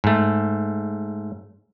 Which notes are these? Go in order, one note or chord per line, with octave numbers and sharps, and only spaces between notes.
G#2 A3